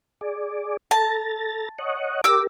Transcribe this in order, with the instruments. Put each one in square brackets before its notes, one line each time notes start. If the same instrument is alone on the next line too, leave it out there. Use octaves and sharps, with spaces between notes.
[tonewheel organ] G#4 D5
[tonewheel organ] A4 A#5 A6 [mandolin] A5
[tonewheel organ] C#5 D#5 F#5
[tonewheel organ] G4 A#4 [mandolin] D6 E6